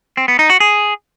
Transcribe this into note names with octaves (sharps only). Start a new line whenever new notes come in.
C4
B3
D#4
F#4
G#4